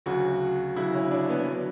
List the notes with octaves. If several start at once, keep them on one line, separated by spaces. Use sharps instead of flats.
D2 C#3 F#3 F#4
D2 C#3 F#3 E4
C#4
D4
B3
D3 F#3